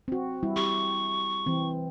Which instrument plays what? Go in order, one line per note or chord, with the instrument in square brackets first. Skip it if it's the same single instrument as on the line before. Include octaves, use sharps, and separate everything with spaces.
[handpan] C4 F#4
G3 E4
[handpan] G4 [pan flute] C#6
[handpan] E3 C4